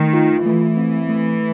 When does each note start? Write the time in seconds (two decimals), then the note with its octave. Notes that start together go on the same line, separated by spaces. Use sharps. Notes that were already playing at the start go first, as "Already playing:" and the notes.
Already playing: D#3 A3
0.13 F4
0.46 E3 A3
0.77 C4
1.09 A3